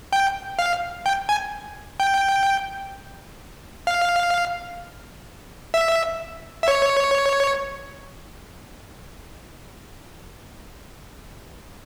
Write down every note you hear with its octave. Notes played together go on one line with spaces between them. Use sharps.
G5
F5
G5
G#5
G5
F5
E5
E5
C#5